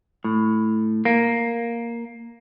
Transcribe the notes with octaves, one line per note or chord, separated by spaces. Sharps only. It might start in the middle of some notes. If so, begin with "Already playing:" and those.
A2
A#3